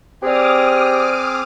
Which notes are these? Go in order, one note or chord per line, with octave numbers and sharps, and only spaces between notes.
C4 G4 G#4 C5 D5 D6 D#6 F6